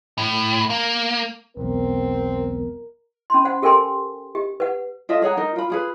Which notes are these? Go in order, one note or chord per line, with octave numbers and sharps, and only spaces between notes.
A2
A#3
E1 B1 C4 A#4
C#4 B5 C6
C5 F#5
G4 A4 A#4 G5 G#5 C6
G4
B4 F#5
F4 A4 D#5 E5
G#4 C#5 F#5 A#5
D#4 A#4
F4 B5
F4 G#4 B4